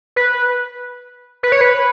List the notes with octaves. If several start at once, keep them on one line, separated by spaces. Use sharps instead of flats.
B4
B4
C#5
B4